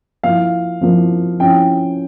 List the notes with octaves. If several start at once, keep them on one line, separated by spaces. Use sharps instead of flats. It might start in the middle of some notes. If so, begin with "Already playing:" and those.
F3 A#3 E4 F5
F3 A#3 E4
F3 C#4 E4 G5